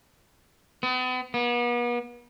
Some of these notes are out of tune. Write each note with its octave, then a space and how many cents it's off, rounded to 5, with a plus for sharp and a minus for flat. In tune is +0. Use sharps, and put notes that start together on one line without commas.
B3 +40
B3 -40